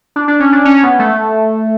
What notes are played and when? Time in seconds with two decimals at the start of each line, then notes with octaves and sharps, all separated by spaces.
0.16 D4
0.28 D4
0.40 C#4
0.53 D4
0.65 C#4
0.83 B3
0.99 A3